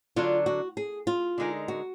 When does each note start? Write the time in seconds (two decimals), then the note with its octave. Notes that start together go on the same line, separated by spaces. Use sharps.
0.16 D3 F#3 D4 F4
0.46 F#4
0.77 G#4
1.07 F4
1.38 D3 G#3 D#4 A#4
1.68 F#4